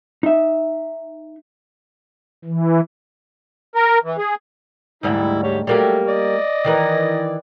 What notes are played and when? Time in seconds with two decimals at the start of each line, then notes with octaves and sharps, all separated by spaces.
0.23 D#4 E5
2.45 E3
3.75 A#4
4.04 E3
4.18 G#4
5.03 D2 G#2 E3 G3 E4
5.43 G4 C#5
5.67 F#3 G3 A3 A#3 G4
6.07 D5 D#5
6.64 D#3 E3 A#4